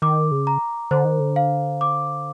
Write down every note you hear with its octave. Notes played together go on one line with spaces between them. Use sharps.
D#3 D6
C#3
A#5
D3 C5
D#3
D3
F5
D6